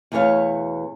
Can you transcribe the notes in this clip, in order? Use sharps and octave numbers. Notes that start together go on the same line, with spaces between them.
E2 B2 A3 C4 C#5 F5